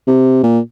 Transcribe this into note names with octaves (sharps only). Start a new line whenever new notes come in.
C3
A#2